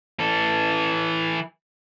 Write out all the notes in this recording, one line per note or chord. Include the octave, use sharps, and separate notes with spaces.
E3 A4